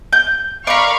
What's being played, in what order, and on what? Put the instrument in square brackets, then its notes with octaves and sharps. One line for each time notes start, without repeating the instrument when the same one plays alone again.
[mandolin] G6
[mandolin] A#4 D5 [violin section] F5 B5 C#6